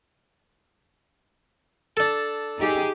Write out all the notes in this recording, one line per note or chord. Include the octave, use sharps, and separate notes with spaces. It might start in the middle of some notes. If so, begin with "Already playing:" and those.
D4 A4
D#4 G4 G#4